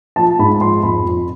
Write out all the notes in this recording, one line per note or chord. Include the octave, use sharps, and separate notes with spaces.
F3 A5
G#2 B5
F3 C6
F2 B5
F2